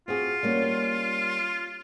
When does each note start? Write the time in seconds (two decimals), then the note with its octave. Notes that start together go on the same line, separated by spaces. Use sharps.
0.08 C4 F4 F#4 G#4
0.43 G3 A#3 C#4